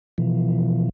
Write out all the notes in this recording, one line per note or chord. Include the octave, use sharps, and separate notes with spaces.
B2 E3 F3